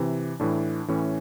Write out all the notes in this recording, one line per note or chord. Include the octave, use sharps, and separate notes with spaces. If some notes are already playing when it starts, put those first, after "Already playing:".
Already playing: C3 E3
A2 E3 D4
A2 E3 C#4